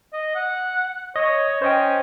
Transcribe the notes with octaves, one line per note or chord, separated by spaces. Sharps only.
D#5
F#5
C#5 D#5 D#6
C#4 C5 D#5 G5